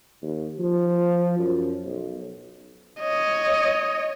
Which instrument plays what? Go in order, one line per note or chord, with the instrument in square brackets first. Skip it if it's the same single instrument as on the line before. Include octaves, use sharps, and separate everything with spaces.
[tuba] D#2
F3
F#2
B1
[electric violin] C#5 D#5